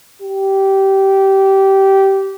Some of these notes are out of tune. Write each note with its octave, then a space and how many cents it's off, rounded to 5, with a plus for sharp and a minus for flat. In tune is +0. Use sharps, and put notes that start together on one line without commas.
G4 -15